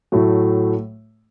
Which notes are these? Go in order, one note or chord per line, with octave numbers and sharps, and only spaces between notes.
A2 F#3 A3